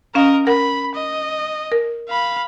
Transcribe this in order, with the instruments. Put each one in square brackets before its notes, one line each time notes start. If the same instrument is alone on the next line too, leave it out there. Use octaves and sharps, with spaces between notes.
[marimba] C#4 F5 [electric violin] A#4 D#5
[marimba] A#4 F#5 [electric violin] B5
[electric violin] D#5
[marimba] A#4
[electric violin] F5 B5